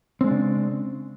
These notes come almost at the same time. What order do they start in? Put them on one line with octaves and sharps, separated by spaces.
C4 G#3 D4 C#3